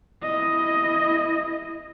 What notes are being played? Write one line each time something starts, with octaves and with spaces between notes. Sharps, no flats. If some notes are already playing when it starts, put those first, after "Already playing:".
E4 D#5